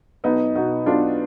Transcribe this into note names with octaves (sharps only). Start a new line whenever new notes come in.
B1 B3 D#4
B2 D#4 F#4
B1 D4 F4